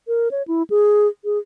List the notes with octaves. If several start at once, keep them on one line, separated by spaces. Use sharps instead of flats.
A#4
C#5
E4
G#4
G#4